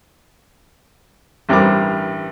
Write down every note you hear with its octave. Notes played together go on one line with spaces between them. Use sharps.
A1 G2 C4 A#4 D6